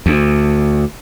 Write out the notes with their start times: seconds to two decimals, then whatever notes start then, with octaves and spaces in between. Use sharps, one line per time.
0.06 D2